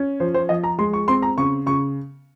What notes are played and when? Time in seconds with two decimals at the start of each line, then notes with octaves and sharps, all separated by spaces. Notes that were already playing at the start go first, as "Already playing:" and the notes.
Already playing: C#4
0.20 F3 C5
0.34 C5
0.49 F3 D#5
0.64 A#5
0.78 G#3 C6
0.93 C#6
1.08 C4 C6
1.22 A#5
1.38 C#3 C#6
1.66 C#3 C#6